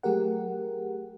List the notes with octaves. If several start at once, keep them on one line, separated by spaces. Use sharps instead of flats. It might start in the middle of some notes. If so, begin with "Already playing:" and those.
F#3 A3 G4 G#4 A#4 F#5